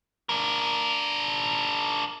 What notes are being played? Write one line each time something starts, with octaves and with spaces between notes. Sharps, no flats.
D4 A#4